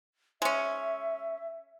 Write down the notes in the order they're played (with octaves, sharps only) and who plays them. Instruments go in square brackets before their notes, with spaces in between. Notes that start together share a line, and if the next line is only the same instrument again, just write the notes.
[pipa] G#3 C#4 [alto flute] E5